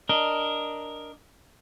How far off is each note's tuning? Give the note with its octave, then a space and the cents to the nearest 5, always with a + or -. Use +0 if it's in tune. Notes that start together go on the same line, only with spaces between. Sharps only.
D4 +0 A#4 +0 D#5 +0